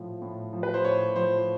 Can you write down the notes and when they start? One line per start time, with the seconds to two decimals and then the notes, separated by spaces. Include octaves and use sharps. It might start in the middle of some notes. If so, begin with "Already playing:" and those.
Already playing: A2 F3
0.22 A2
0.53 F3
0.63 B4
0.74 C5
0.84 A2 C#5
1.16 F3 C5